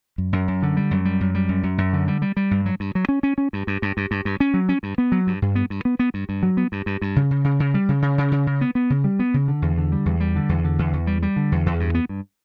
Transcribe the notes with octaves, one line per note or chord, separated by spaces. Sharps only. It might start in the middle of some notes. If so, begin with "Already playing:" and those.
F#2
F#2
F#2
D3
G3
F#2
G3
F#2
G3
F#2
F#2
F#2
D3
G3
G3
G3
G2
F#3
G2
F#3
C#4
C#4
C#4
G2
G2
G2
G2
G2
G2
C#4
F#3
C#4
G2
B3
F#3
G2
G2
B3
G2
B3
B3
G2
G2
F#3
B3
G2
G2
G2
C#3
C#3
C#3
C#3
G3
C#3
C#3
C#3
C#3
C#3
B3
B3
C#3
G3
B3
C#3
D3
E2
D3
G3
E2
G3
D3
E2
D3
E2
E2
G3
G3
D3
E2
E2
G2
B3
G2